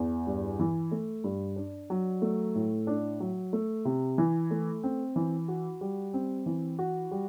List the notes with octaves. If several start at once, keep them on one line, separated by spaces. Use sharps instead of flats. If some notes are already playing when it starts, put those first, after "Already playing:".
Already playing: E2
G2
E3
A3
G2
D4
F#3
A3
A2
D4
F#3
A3
C3
E3
A3
C4
E3
F#4
G3
C4
E3
F#4
G3